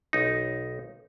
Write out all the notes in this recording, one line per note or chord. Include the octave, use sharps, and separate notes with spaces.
B1 D#4